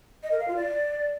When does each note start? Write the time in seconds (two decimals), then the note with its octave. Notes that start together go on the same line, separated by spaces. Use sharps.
0.23 D#5
0.31 A#4
0.40 F5
0.48 F4
0.56 D5